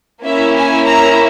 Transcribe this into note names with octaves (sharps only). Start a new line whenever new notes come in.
A#3 C#4 E4 E5
G#5
A#5